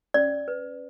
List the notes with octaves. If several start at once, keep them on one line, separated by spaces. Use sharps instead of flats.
C#4 D5
B4